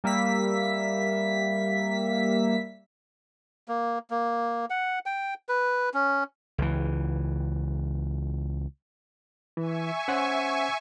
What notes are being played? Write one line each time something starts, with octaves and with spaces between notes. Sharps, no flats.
G3 A#3 E5 B6
A#3
A#3
F#5
G5
B4
C#4
C#2 E3
E3 E5 G#5 C#6
C#4 C5 F#5